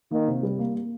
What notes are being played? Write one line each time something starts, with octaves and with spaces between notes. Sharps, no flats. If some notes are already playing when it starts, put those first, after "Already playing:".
D#3 A#3
C3
G3
A#3
A#3